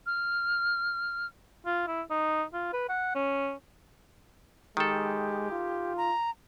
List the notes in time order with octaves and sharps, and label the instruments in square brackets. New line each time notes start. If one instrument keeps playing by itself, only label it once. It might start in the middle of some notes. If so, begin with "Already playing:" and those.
[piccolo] F6
[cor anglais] F4
E4
D#4
F4
B4
F#5
C#4
[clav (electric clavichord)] D#3 A4 [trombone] G#3 [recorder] G4
[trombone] F4
[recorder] A#5